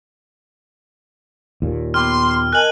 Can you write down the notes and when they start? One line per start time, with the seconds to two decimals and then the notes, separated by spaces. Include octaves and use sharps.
1.62 D#2 A#2
1.94 B3 G5 C6 D6 F6
2.53 A#4 D#5 G#5 A5 F#6 F#7